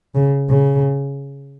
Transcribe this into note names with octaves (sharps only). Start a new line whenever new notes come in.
C#3
C#3